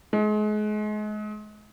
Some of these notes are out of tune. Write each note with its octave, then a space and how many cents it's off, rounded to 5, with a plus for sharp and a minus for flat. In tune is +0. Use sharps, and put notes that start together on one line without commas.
G#3 +35